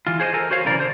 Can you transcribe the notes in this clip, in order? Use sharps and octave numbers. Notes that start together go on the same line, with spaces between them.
E3 F4
G#4 C5 C#5 D#5
A4 A#4 G#5
F#4 C5 C#5 F5
B1 C#3 E3 A#4 D5
D3 C5